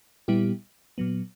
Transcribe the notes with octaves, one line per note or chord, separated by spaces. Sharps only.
A#2 G3 B3 E4 G4
A#2 F#3 B3